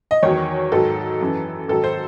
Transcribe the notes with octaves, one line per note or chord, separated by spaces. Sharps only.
D#5
E2 D#3 F#3 C#5
G#2 D#3 F#3 A4
F#2 E3
G#2 D#3 F#3 A4
C5